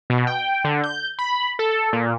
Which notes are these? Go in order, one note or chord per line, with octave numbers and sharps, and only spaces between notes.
B2
G5
D3
G6
B5
A4
A#2